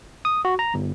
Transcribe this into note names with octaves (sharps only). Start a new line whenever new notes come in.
D#6
F#4
A#5
G1